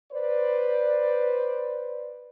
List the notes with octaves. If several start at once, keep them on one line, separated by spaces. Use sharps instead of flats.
B4 C5 D5